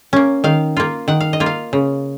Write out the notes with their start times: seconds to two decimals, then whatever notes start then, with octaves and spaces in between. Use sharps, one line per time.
0.13 A#3 C#4
0.44 D#3 F5
0.77 A#3 F4
1.08 D#3 F#5
1.21 F5
1.33 D#5
1.40 A#3 F4
1.46 F5
1.73 C#3